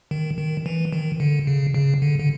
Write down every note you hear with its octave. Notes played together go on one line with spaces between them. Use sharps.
D#3
D#3
E3
D#3
D3
C#3
C#3
D3
D3